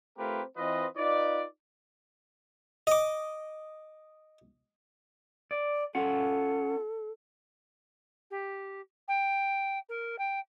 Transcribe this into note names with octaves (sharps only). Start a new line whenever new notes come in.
A3 C4 F4 G4 A#4 B4
E3 C4 F4 B4 D#5
D#4 F4 B4 D5
D#5 D6
D5
C#4 F4 A4 F#5
G4
G5
A#4
G5